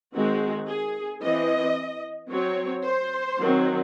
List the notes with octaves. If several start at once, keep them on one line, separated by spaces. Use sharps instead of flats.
D#3 G#3 C4 F#4
G#4
E3 C4 D#5
F#3 C4 C#5
C5
D#3 F#3 C4